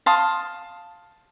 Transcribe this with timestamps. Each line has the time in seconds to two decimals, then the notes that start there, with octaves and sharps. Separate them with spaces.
0.06 F5 A5 C6 D#6